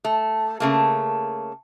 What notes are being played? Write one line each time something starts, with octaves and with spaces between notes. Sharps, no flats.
A3
C#3 A3 A#3